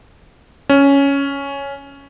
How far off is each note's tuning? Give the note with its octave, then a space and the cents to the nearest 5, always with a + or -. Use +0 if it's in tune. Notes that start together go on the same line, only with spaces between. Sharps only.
C#4 +5